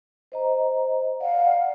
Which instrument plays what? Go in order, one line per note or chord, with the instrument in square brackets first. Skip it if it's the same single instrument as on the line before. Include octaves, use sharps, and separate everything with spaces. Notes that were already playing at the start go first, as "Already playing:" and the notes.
[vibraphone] C5 D#5 A#5
[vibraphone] D5 [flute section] F5 F#5